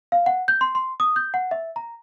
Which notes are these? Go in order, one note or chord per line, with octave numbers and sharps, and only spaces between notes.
F5
F#5
G6
C6
C6
D#6
G6
F#5
E5
A#5